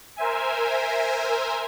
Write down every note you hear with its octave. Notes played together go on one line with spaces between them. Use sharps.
A#4 C5 E5 G#5